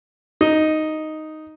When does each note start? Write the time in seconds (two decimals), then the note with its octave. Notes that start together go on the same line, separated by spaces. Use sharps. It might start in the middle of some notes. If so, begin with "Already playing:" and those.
0.41 D#4